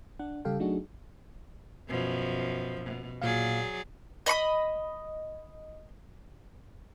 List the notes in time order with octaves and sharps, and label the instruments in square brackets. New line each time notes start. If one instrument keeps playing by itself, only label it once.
[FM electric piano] D4 F#5
C#3 G3 G4 A4 F5 G5
F#3 A3 D4 D#4 F#4 G#4
[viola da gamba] F#2 B2 F3
B2
[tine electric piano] A#2 F5 [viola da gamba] F#3 G#4 D5
[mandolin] D#5 B5 C#6 D#6